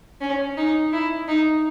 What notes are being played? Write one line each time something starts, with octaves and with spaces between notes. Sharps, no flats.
C#4
D#4
E4
D#4